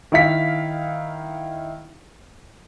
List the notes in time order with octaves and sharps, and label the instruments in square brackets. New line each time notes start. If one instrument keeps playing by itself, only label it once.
[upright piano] D#3 E4 F5 B6